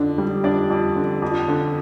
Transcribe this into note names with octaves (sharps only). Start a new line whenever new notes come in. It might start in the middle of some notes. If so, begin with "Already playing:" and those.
Already playing: F2 D3 D4
G3
F2 D4 D5
F2
D3
F2
D3